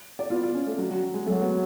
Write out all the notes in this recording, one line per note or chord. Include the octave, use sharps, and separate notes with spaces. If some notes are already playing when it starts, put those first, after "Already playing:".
D5
B3 F4
F4
C#4
A3
F#3
F#3
F#3
G#3
F#3 A3
B3